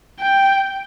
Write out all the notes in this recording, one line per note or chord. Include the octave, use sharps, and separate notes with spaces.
G5